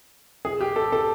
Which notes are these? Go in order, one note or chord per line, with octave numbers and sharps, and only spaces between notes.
G#4
G4
A4
A4